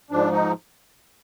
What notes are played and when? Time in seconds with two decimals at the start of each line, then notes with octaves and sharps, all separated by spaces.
0.11 G#2 F3 D4
0.33 D#4